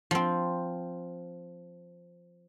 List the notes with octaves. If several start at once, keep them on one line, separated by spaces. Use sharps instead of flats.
F3 C4